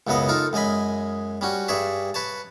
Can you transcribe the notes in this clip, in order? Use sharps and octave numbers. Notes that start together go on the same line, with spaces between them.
C#2 F#2 C#3 B3 D#5 F#5
D#4 F4 A4 A#4
F#2 G#3 D#5 G#5 B5
G3 C#4 F#4
G2 G#4 C#5 D5 E5
B4 C#5 A5